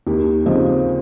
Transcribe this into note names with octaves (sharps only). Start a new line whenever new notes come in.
D#2 G4
C#3 F3 C4 D#4